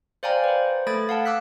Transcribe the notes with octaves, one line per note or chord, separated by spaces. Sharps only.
C5 D5 F5 G5 G#5 A#5
B4 C5
A3 A4 B5 G#6 A6 D7
F5 F#5 A5
D6 E6 F#6 B6